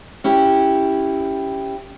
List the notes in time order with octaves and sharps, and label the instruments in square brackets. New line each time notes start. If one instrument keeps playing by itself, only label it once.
[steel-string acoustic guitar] C#4 E4 G4